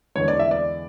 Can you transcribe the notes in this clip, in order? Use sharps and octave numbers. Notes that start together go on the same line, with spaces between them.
E2 D3 G#3 C#5
D5
E5
D5